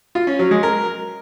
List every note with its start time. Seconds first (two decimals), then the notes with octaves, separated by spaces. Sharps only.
0.15 F4
0.27 C#4
0.39 F#3
0.51 G#3
0.63 A#4